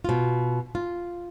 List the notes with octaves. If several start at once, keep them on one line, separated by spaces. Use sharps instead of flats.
B2 F4
F4